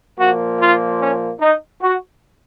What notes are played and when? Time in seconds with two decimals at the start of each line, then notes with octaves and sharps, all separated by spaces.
0.18 A#2 F3 A#3 F#4
0.59 F4
0.99 C#4
1.40 D#4
1.82 F#4